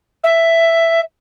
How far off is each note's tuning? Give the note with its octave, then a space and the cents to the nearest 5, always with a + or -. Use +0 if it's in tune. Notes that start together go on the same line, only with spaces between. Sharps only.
E5 +10